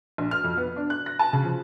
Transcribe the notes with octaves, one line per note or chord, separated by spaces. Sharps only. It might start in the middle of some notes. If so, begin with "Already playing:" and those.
A#1
F6
F2
B3
D4
F#6
A#6
A5
C#3
F3